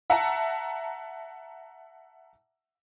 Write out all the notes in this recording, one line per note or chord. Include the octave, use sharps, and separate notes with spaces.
E5 F#5 A5 A#5